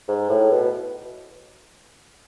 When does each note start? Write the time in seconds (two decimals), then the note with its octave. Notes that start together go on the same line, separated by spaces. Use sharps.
0.08 G#2
0.29 A2
0.51 B2